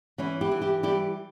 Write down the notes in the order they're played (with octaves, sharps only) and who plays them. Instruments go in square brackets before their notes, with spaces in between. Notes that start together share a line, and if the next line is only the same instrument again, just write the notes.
[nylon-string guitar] E3 C#4 E4
E4 G4
E3
E4 G4
G3 E4 G4